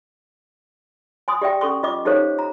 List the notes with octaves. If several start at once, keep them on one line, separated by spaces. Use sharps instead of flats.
G#5 C6 D#6
G4 D5 E5 G5
C#4 A4 C6 C#6
F4 D#5 D6
D#4 G4 A4 C5 C#5 F5
A#5